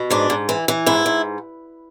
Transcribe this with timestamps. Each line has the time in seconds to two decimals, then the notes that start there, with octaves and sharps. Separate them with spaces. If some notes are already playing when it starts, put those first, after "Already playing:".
Already playing: B2
0.11 G#2 D4
0.30 G#2
0.49 E3
0.68 E3
0.86 G#2 E4
1.06 G#2